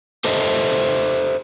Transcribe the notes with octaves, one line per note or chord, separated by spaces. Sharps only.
G4 A4 C5 D#5 E5